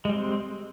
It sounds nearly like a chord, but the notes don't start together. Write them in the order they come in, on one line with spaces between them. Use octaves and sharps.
G#3 G3 C4